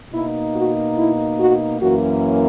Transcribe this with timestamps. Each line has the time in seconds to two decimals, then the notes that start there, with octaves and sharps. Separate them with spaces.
0.12 B2 A#3 D#4 E4
0.54 F#4
0.96 E4
1.38 F#4
1.80 F#2 E3 A#3 C#4 F#4